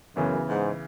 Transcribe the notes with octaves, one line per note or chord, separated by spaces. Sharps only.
F#2 C#3 E3 B3
G#2